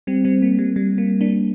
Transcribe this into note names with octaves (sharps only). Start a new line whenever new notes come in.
G3 C4
G3 C4
A#3
G3
G3
A#3
A#3 D4